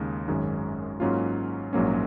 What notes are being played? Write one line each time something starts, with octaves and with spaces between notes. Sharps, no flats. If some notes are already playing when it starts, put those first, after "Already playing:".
Already playing: D#2 C#3 G#3 D#4
G#1 F#2 D#3 G#3 C#4
G#2 F#3 A#3 C#4 F4
A#1 G#2 F#3 A#3 C#4